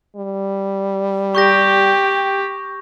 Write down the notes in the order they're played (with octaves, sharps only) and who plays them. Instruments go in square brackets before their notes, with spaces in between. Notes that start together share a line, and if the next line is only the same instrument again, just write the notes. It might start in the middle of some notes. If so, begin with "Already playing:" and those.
[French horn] G3
[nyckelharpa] G4 [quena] G5 [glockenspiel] C#6 G6 A#6